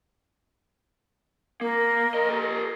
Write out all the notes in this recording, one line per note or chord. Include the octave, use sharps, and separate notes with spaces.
A#3 A#4
F3 D#5
G4 A4